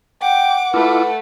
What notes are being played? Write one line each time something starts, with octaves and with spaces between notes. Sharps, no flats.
F#5 G5 D6
A3 E4 F4 A4 B4 D6